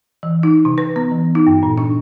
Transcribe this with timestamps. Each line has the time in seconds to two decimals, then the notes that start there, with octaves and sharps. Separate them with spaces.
0.23 E3
0.43 D#4
0.65 C3
0.78 B4
0.96 B3
1.11 E3
1.35 D#4
1.47 G2
1.63 A#2
1.78 D4